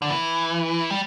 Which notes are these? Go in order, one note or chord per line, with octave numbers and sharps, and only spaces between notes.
D3
E3
G3